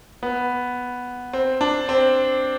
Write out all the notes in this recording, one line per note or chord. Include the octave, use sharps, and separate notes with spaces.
B3
C4
D4
C4